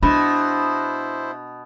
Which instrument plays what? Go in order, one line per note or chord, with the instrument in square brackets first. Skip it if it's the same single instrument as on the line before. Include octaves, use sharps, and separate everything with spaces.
[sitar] B2 [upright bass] D4 [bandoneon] E4 C5 [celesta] B5